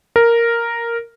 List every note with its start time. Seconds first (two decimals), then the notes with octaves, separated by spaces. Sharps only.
0.16 A#4